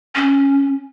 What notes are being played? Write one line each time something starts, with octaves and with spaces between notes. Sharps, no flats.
C#4